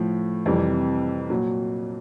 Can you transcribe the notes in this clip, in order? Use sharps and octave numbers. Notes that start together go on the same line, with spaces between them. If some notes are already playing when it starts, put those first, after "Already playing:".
Already playing: A2 F3
F2 C3 E3 G3
A#2 F#3